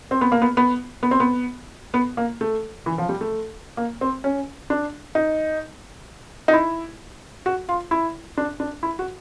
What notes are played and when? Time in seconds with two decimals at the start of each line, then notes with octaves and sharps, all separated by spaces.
0.11 C4
0.21 B3
0.32 A#3
0.42 B3
0.57 B3
1.03 B3
1.11 C4
1.20 B3
1.94 B3
2.17 A#3
2.41 A3
2.86 E3
2.98 F3
3.09 G3
3.21 A3
3.77 A#3
4.01 C4
4.24 C#4
4.70 D4
5.15 D#4
6.48 D#4
6.53 E4
7.46 F#4
7.69 F4
7.91 E4
8.37 D4
8.60 D4
8.83 E4
8.99 F#4